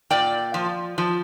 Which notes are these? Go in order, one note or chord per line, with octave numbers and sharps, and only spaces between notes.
A#2 D5 G5
F3
F3